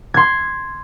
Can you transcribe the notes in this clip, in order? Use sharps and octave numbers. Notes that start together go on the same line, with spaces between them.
C6 G#6